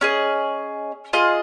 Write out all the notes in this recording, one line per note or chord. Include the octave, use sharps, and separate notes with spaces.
C#4 G#4 D#5
F4 G#4 D#5